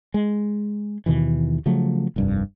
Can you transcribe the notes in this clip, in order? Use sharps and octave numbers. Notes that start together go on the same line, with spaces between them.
G#3
D#2 B2 D#3 E3
C#3 F3 F#3 A3
F1 C2 G2